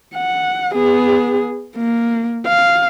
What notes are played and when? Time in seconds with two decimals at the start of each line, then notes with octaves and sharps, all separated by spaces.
0.15 F#5
0.74 B3 G#4
1.77 A#3
2.47 F5